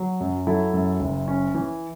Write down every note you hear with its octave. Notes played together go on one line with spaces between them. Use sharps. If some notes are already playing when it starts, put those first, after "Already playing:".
Already playing: F#3
F#2
F#3 E4 A4
F#2
F#1
C#4
E3